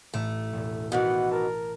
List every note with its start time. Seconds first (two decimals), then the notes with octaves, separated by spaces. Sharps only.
0.14 A1 A2 A3
0.53 E1
0.92 B2 D#3 E3 F#5 D#6 G6 B6
1.31 A#4 A5